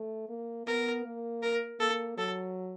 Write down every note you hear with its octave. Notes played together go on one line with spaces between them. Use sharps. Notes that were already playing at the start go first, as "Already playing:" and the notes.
Already playing: A3
A#3
B3 A#4
A#3
A#4
A#3 A4
F#3 A4